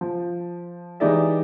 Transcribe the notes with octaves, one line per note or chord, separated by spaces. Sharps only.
F3
E3 G#3 D#4 G4 D5 E5